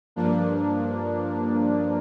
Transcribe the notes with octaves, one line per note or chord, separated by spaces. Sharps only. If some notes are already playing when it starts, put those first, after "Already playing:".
G2 F3 A#3 D4